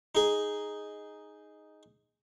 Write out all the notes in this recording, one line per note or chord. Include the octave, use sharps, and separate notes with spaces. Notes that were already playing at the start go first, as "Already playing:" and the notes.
D#4 G#4